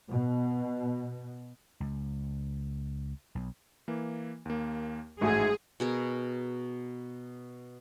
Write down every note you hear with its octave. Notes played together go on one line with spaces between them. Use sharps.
B2
C#2
B1
E3 A#3
D#2 A#3
A1 G#2 A3 F#4 G#4
B2 G#4 A#4